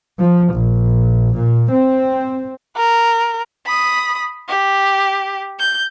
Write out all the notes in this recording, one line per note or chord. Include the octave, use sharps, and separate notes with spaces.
F3
A#1
A#2
C4
A#4
B5 D#6
G4
G6